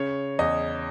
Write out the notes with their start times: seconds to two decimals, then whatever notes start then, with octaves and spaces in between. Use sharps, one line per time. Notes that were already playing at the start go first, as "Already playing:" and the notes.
Already playing: C#3 C#5
0.39 E2 D#5